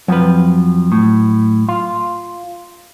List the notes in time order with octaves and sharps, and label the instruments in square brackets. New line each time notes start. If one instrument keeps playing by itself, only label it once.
[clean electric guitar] F2 F3 [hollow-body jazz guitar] F#3 B4
[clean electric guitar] A2
F4